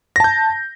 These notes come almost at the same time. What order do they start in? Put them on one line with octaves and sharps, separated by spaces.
A#6 A5 G6